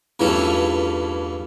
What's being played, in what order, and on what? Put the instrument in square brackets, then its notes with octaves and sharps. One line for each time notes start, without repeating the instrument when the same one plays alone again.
[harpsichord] E2 G2 E3 F3 A3 C#4